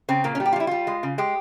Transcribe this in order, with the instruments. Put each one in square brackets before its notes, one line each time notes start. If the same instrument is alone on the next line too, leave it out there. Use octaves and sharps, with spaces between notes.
[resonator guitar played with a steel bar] C#3 C4
A#2 A#3
C#4
G3
G4
F4
G3 E4
G3 F4
G#3
C#3
G#3 G4